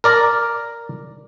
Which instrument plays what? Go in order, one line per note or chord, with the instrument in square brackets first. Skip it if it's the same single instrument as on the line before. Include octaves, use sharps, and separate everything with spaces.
[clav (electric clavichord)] A#4 D5 A#5